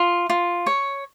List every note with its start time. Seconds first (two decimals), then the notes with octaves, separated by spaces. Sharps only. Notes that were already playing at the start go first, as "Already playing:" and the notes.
Already playing: F4
0.30 F4
0.66 C#5